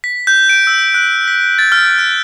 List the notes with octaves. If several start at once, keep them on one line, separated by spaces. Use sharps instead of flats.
B6
G6
D7
E6
F#6
B6
A6
F6
G6